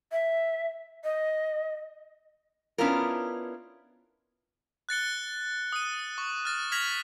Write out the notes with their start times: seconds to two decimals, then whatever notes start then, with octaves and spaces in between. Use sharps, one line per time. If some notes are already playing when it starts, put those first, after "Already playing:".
0.12 E5
1.04 D#5
2.78 B3 C#4 D4 E4 F4 A#4
4.89 F#6 A6 C#7 G7
5.72 D#6 D#7
6.18 C#6
6.45 F6 A6
6.72 F6 G#6 A#6 B6 F7 F#7